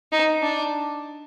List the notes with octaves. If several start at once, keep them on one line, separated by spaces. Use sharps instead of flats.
D#4
D4